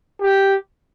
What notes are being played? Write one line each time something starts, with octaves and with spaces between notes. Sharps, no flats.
G4